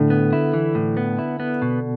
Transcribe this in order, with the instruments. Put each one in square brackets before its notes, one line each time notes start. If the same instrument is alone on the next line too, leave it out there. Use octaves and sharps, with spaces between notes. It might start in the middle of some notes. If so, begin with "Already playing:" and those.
Already playing: [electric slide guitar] A2 [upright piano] D3
[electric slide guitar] B3
E4
E3
A2
B3
E4
B3
B2